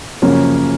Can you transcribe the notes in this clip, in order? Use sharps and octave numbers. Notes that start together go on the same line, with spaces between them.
F#2 C#3 F3 A#3 C#4